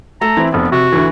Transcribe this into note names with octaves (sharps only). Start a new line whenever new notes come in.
A3 A4 A#5
E3 C4 E4
F1 B3 C4
C3 F#4
D2 E3